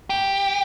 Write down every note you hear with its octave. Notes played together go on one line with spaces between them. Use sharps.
G4